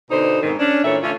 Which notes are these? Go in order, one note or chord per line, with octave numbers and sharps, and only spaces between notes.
B2 D3 D#4 C5
G#2 B2 D#3 C4
C#4 D4
A#2 E3 A4 C#5 E5
D3 A3 C#4 F4